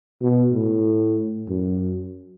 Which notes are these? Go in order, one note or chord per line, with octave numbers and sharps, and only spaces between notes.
B2
A2
F#2